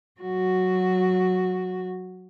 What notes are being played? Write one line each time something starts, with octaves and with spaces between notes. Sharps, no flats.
F#3 F#4